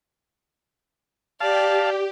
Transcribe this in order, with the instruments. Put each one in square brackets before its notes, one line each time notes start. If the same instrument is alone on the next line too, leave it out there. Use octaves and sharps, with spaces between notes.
[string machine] G4 [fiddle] D5 [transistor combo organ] F5 A5